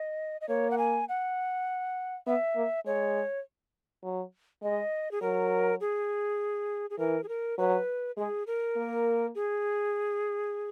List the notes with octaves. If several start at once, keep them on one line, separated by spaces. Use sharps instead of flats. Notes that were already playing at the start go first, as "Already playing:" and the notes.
Already playing: D#5
D#5
A#3 C#5
F#5
G#5
F#5
B3 E5
A#3
G#3 C#5
F#3
G#3 D#5
G#4
F#3 A#4
G#4
G#4
E3 A#4
G#4
A#4
F#3 B4
G#3 G#4
A#4
A#3
G#4